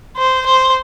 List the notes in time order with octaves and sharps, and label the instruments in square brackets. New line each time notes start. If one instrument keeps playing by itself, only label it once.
[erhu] C5
C5